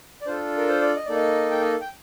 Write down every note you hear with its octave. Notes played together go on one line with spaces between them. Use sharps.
D5
D4 F4 A4 C5
A#4
C5
D5
D#5
A#3 D#4 A4 D5
D#5
G5
D#5
G5